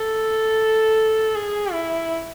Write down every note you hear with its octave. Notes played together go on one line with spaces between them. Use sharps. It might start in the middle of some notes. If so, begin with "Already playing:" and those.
Already playing: A4
G#4
E4